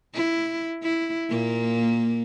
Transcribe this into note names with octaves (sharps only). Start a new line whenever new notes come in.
E4
E4
A#2 A#3